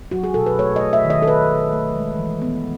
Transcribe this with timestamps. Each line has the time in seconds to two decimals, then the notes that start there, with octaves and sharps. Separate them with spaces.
0.11 F#3 F#4
0.24 G#4
0.34 B2 A4
0.46 B4
0.59 A3 C#5
0.76 A3 D#5
0.93 E5
1.05 D#3
1.10 D#5
1.22 A4
1.27 D#3 B4
1.50 A3
1.73 A3
1.96 G#3
2.18 E3
2.42 B3